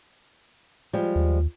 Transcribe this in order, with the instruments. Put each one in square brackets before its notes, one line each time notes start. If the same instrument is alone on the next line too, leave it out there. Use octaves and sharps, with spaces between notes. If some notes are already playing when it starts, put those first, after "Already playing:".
[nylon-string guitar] F3 G3 G#3
[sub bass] D#2